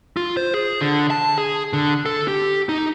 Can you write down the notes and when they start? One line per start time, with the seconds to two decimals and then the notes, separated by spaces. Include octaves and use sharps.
0.17 F4
0.37 C5
0.54 G#4
0.81 D3
1.10 A5
1.38 G#4
1.73 D3
2.06 A4
2.28 G4
2.69 D#4